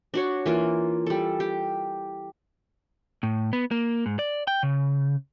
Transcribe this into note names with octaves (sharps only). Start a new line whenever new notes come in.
D4 F#4 C#5
E3 A#3 F4
G3 A4
G4
A2
B3
A#3
G#2
D5
G5
C#3